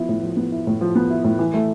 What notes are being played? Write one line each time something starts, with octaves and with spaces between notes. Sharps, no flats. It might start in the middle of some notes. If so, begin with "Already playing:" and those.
Already playing: F3 B3 E4
A2
F3
B3
E4
A2
F3
B3
E4
A2
E3
A3